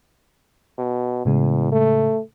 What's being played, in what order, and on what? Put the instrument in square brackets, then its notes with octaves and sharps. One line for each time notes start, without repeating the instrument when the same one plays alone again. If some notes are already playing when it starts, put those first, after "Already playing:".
[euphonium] B2
[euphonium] E2 [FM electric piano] A2 C#3 G#3
[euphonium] A3